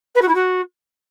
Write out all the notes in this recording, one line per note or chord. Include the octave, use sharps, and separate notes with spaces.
B4
F#4
E4
F#4